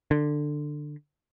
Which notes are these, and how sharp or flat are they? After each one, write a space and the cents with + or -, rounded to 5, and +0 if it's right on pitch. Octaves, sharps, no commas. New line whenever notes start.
D3 +15